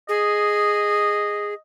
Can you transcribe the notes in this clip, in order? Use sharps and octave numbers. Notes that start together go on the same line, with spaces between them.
G#4 D#5